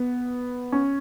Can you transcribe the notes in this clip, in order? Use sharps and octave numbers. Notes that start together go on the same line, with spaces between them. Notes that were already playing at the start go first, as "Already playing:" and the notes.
Already playing: B3
C#4